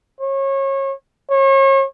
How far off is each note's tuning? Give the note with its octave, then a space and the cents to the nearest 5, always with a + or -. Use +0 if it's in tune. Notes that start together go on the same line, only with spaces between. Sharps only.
C#5 -30
C#5 -35